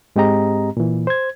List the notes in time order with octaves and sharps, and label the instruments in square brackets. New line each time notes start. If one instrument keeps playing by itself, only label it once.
[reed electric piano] G#2 G#3 C4 G4 D#5 A#5
A#2 E3
C5 G#6